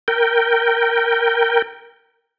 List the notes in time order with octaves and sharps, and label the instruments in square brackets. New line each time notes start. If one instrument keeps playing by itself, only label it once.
[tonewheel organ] A#4 G5